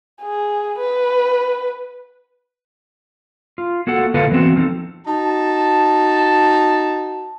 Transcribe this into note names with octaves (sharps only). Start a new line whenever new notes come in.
G#4
B4
F4
A#3 F#4 A4 F#5
D3 A#3 E4 F4 A4 B4
E3 B3 C4 F#4
F3 C4 D#4 A4
D#4 F#4 A5